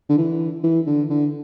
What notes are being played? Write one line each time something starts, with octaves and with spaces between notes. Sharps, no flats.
D3
E3
E3
D3
D3